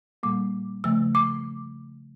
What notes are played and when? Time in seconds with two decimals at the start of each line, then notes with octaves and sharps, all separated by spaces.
0.23 A#2 G3 A#3 D6
0.84 C#3 F3 A3 E6
1.15 D6